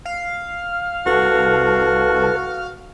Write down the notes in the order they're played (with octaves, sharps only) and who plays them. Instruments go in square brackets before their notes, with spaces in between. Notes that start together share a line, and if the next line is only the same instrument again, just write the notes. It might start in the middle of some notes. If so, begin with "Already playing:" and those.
[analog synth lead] F5
[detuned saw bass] C2 [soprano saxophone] F#4 [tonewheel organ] A4 B4 A5